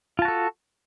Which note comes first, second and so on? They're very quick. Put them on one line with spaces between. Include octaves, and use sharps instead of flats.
F4 A5 F#4 A4